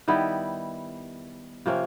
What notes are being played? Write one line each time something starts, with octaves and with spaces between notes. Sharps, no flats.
D#3 G3 B3 E4
C3 F3 A#3 C#4